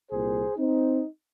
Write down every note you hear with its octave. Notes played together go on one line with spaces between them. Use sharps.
C2 A#2 G#4 C5
C4 D#4